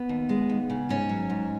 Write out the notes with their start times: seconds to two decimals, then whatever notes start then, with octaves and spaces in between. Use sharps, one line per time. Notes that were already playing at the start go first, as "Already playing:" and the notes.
Already playing: B3
0.09 D#2
0.29 G#3
0.49 D#2
0.70 C#3
0.89 G#2 C#4
1.09 F#3
1.30 G#2